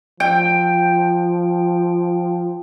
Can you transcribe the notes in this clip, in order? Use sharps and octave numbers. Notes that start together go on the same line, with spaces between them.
F3 G5